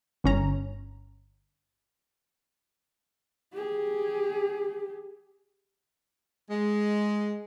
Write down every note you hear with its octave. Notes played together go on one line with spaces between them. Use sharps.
G1 C#4 A#5
G4 G#4
G#3